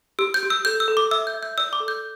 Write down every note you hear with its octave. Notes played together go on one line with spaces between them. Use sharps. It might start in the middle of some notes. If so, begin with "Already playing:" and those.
G4 E6
G6
G4
E6
A4 G6
E6
A4
D6
E5 E6
G6
E5
G6
D5 E6
D6
A4
G6